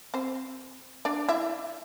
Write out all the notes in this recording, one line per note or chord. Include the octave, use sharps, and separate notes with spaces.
C4 C5
D4 D5
E4 E5